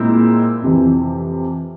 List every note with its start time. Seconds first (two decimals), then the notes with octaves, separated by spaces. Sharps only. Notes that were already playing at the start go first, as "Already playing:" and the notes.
Already playing: A#2 G#3 C4 E4 A#4
0.62 F2 C3 E3